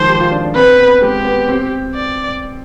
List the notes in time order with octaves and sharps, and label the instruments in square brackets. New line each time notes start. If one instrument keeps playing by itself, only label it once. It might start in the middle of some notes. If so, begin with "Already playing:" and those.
Already playing: [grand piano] D#3 F3 G#3 [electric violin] C5
[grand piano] G4
F4
D4
D4
[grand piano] C4 [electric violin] B4
[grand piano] B3
[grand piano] G#3 [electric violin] G4
[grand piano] B3
C4
[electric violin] D5